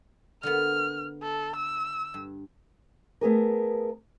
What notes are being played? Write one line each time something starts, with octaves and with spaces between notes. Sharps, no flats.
D3 A#3 B3 F6
A4
E6
G2
A3 B3 G#4 A#4